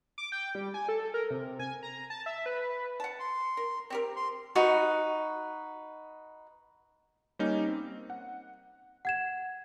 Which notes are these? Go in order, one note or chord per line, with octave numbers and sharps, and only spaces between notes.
D6
G5
G3
G#5
A4
A#4
C3
G#5
A#5
A5
E5
B4
F#5 A5
C6
A#4
C4 G4 A#4
C6
D#4 F#4 B4
G3 A#3 C#4 D#4
C4
F#5
F#5 G#6 E7